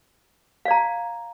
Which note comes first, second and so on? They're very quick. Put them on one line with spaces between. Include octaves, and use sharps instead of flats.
F5 D5 A#5